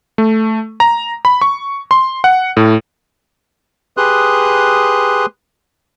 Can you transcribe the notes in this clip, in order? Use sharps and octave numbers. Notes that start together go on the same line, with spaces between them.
A3
A#5
B5
C#6
C6
F#5
A2
G4 G#4 B4 C6 D#6 F#6